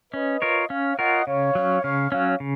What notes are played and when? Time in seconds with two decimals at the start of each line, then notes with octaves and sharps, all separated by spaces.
0.13 C#4 B4 D#5
0.42 F4 A#4 C#5
0.70 C#4 C#5 F5
0.98 F4 A#4 C#5 D#5 F#5
1.27 C#3 C#5 F5
1.55 F#3 C#4
1.83 C#3 C#5 F5
2.11 F#3 C#4 C#5 F5
2.40 C#3